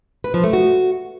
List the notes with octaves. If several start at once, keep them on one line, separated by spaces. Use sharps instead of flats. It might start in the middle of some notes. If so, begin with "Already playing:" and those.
B4
F3
A3
F#4